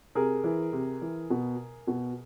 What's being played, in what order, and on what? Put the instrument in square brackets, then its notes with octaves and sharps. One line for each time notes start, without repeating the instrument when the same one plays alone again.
[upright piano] C3 G#4 A#4
E3
C3
E3
B2
B2